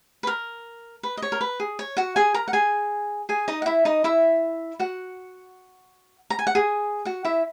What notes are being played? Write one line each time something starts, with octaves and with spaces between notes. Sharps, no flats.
B4
A#4
B4
D#5
C#5
A#4
B4
G#4
C#5
F#4 F#5
G#4 G#5
A#4 A#5
F#5
G#4 G#5
G#4 G#5
D#4 D#5
F#5
E4 E5
D#4 D#5
E4 E5
F#4 F#5
A#5
G#5
F#5
G#4 G#5
F#4 F#5
E4 E5